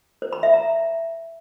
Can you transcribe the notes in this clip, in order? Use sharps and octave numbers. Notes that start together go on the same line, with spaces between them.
C5
B5
E5
A#5